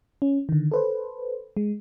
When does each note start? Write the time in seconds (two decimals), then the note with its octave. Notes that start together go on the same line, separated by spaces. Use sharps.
0.22 C#4
0.49 D3 D#3
0.72 A4 B4 C5
1.57 G#3